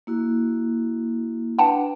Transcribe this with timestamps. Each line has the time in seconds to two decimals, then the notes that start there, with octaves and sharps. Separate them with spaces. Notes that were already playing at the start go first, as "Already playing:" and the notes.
0.07 A#3 E4 F#4
1.59 D4 B4 F#5 G5 A5